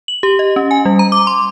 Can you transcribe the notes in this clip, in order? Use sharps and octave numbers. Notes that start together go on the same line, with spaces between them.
F#7
G4
D#5
C#4
G#5
G3
A#5
D6
C6